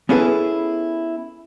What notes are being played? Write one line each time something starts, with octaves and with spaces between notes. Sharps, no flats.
B3 C#4 E4 G#4 A4 B4